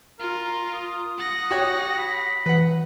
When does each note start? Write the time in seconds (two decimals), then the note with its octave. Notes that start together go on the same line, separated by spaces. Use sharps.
0.20 F4 A#4
0.73 D#6
1.18 F#5 A#6
1.51 F#4 G4 C#5
1.98 B5
2.46 E3 B4 F#5